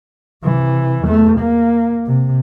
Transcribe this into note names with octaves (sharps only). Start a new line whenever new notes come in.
C3 E3
E2 A3
A#3
C3